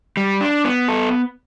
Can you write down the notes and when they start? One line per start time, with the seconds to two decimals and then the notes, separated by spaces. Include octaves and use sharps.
0.17 G3
0.41 D4
0.64 B3
0.88 A4